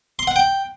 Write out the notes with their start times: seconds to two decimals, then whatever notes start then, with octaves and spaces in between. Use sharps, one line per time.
0.19 C6
0.27 F#5
0.36 G5